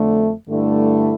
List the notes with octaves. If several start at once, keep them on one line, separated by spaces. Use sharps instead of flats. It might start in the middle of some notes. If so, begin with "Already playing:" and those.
Already playing: F2 D3 A3
G2 D3 A3 E4